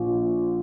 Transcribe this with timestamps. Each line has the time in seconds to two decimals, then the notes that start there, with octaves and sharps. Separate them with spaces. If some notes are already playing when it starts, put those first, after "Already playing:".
Already playing: A#1 F3